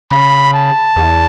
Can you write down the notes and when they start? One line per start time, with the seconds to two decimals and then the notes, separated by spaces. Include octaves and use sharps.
0.11 C#3 B5
0.54 A5
0.96 E2